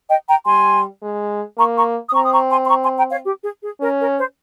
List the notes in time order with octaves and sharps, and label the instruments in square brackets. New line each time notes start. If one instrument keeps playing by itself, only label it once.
[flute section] D#5 G5
G5 A#5
[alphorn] G3 [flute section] G#5 C6
[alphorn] G#3
[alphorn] A#3 [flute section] A#5 C#6
[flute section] A#5 C#6
D#6
[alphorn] C4 [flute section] A#5 C#6
[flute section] D#6
A#5 C#6
G#5 C6
C6
A#5 C#6
G#5 C6
G5 A#5
C#5 F5
G4
G#4
G#4
[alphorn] C#4 [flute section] A#4
[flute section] A#4
C5